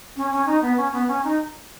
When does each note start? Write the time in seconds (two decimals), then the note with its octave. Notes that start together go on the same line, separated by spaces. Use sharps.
0.16 C#4
0.31 C#4
0.46 D#4
0.62 B3
0.77 C#4
0.93 B3
1.08 C#4
1.24 D#4